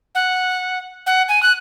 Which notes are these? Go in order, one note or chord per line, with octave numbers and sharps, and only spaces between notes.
F#5
F#5
G#5
F#6